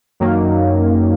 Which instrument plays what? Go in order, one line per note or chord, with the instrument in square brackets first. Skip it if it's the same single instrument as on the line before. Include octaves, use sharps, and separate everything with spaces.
[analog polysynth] F#2 D#3 F#3 A#3